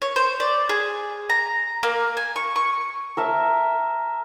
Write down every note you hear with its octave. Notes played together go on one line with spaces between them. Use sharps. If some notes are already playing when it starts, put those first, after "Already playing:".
C#5
C5
D5
G#4
A#5
A#3
G#5
C#6
C#6
A#4 E5 A5